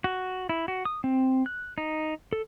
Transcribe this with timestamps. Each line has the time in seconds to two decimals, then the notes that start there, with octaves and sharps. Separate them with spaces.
0.04 F#4
0.49 E4
0.68 F#4
0.85 D#6
1.04 C4
1.46 F#6
1.78 D#4
2.33 A4